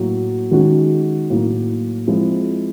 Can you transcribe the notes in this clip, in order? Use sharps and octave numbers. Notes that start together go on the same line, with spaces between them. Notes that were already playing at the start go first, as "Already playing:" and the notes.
Already playing: A2 F#3 A#3
D#3 G#3 C#4 F#4
A2 F#3 A#3
F3 G#3 C4 E4